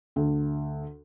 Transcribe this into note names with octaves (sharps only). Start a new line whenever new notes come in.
D2